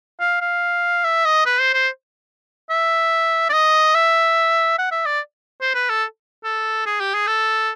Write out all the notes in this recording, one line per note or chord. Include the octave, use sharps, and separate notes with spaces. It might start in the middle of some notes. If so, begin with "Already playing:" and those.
F5
F5
E5
D#5
B4
C5
C5
E5
D5
D#5
E5
F#5
E5
D5
C5
B4
A4
A4
G#4
G4
G#4
A4